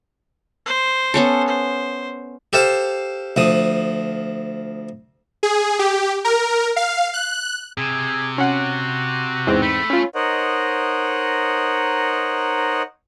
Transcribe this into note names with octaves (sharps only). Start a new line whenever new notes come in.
C5
B3 C#4 A4
C5
G4 A4 C5 F5
D2 F3 D#6
G#4
G4
A#4
F5
F#6
C3 G#4
C#4 F#4 F#5
E2 G#2 C4
A3 B5
C#4 F4
D#4 A#4 C5 C#5 D#5 F#5